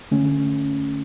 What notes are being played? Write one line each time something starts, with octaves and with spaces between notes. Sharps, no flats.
D3 A3 C#4